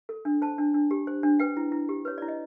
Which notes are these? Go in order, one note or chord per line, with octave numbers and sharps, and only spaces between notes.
A4
D4
C5 A5
D4
D4
G4
C5
D4
B4 G5
E4
E4
G4
B4 C#5
E4 D5
D#5